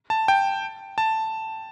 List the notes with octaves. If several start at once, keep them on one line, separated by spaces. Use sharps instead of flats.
A5
G5
A5